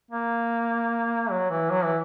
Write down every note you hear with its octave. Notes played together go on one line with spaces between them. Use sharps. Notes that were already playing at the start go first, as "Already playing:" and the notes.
A#3
F#3
E3
F#3
E3